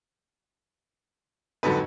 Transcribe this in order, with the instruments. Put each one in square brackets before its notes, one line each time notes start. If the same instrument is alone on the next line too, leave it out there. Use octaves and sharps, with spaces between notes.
[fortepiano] F2 G#2 F#3 [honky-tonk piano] D3 A4 B4